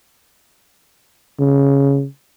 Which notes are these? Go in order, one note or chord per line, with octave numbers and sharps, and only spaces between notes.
C#3